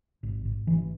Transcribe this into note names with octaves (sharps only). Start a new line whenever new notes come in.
G#1
G#1
E3